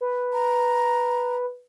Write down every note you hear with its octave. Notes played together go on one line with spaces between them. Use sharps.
B4
A#5